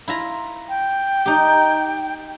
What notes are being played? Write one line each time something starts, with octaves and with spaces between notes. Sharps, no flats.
E4 F4 A#5
G5
D#4 G4